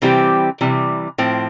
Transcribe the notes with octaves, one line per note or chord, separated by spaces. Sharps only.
C3 E3 G3 C4 G4
C3 E3 G3
A2 F3 C4